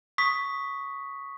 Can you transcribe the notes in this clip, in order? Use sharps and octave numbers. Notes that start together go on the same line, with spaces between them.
C#6 D#6 B6